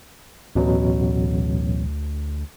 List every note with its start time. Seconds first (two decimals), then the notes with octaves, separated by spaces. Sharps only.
0.55 A1 D2 B2 F#3